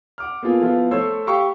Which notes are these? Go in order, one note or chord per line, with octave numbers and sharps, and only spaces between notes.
F#5 D6 F6
A#3 B3 F4 G#4 A4
F3 B3 E4 F4
A3 C5 C#5 E6
G4 F5 G5 B5 C#6